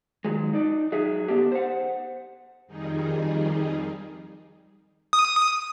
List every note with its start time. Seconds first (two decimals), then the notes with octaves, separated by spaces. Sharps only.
0.25 D#3 F#3 G#3
0.53 D#4 D5
0.92 F#3 G#4 E5
1.28 D3 B3 D4 G4
1.52 C5 F#5
2.67 F2 D#3 G3 D#4 G#4
5.13 D#6